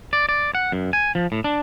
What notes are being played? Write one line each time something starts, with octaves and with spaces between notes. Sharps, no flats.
D5
D5
F#5
F#2
G#5
F3
A2
D4